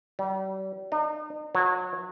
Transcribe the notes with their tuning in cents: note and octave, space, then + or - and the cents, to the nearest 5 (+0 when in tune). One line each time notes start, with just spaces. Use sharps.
G3 -40
D#4 -40
F#3 -30